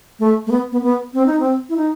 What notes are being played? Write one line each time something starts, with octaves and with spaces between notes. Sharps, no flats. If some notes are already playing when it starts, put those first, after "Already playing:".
A3
A3
B3
B3
B3
C4
D#4
C4
E4
D#4